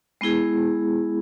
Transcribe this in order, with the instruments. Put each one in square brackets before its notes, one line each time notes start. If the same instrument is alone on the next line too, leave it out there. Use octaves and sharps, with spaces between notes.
[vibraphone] G#3 B3 E4 G#4